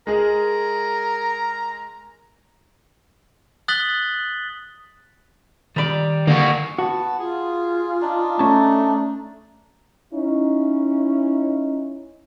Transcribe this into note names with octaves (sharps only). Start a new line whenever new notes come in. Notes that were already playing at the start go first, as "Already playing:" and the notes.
G#3 G#4 A#4 A#5
D#6 F#6 A6 B6 F#7 G7
D#3 G3 D5 B5
D3 A#3 F#4
B3 F#4 A5
F4 G#4
D4 D#4
A3 C#4 A5
C#4 D#4 E4